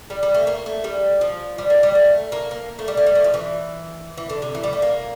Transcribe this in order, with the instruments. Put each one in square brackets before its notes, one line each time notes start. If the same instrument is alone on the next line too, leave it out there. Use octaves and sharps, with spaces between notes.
[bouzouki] G3
G3
A3
A#3
A3
G3
F3
G3
A#3
G3
A3
A#3
A#3
A3
G3
A3
G3
A3
F3
E3
E3
D3
C3
E3
G3
A3
A#3